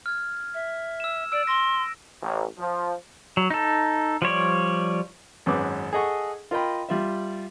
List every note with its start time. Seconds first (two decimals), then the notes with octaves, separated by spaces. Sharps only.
0.06 F6 G#6
0.54 E5
1.00 E6 E7
1.32 D5 E6 D7
1.47 C6 A#6
2.22 A1
2.58 F3
3.37 F#3
3.50 D#4 A4
4.22 F3 G3 C#5 D5
5.46 G#1 F#2 C#4 G#4 B4 D6
5.93 G#4 A4 D#5 F#5 C#6
6.51 F4 A#4 D#5 G5 B5
6.89 G3 F4 E5